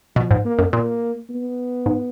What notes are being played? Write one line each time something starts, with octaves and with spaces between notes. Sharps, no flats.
B2 F3
G#2
A#3
F#2
A#2 A#3
B3
G#2